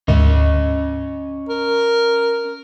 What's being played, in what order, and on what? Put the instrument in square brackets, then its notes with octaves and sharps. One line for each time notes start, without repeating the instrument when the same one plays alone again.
[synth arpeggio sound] D2 G#2 [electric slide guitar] C#4 D#5
[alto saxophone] A#4